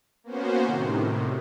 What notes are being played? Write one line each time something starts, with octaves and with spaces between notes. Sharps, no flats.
A#3 B3 C#4 F#4 C5
A2 C3 D#3